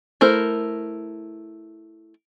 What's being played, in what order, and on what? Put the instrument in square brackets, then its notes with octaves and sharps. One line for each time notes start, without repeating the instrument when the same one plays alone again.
[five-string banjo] A3 E4 A#4 C5